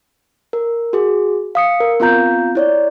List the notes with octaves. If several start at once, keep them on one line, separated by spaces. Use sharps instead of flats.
A#4
F#4 G#4
F5 D#6 C#7
A#4
B3 C4 F4 F5 A#5 G6
E4 C#5 D5